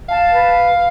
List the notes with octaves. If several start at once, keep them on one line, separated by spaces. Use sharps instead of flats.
F5 A5
B4